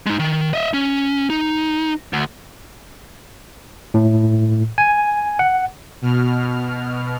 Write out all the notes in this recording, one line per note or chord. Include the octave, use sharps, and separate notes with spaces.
G#3 D#4
D#3
D#5 E5
C#4
D#4
D2
A2
G#5
F#5
B2 F6